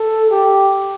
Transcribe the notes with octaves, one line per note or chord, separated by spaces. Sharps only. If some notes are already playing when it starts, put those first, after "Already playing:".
Already playing: A4
G4